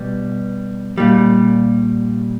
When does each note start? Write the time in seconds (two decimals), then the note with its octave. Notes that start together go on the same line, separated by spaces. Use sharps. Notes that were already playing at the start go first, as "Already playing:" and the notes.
Already playing: B2 G3
0.98 A#2 G3